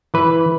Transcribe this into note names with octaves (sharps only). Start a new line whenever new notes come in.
E3 B4